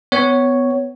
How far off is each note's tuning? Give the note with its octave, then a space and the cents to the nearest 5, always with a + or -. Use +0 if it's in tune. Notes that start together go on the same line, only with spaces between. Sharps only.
B3 +20 C#5 +0